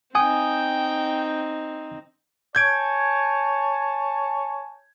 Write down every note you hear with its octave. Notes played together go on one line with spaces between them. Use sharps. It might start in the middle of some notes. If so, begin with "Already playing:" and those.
C4 D#4 G5 G#5 D#6
C#5 G#5 A5 G6 G#6 D7